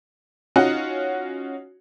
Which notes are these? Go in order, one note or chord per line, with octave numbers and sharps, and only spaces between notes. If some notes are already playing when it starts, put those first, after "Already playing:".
C#4 D#4 F4 F#4 F#5